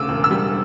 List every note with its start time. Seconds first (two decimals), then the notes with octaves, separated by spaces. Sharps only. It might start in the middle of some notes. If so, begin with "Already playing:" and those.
Already playing: D2 C#3 D6 E6
0.09 E1
0.24 E6
0.31 G3